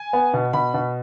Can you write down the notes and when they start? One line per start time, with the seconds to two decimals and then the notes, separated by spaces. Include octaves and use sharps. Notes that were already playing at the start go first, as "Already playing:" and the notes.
Already playing: G#5
0.13 B3
0.34 B2
0.53 B2 B5
0.74 B2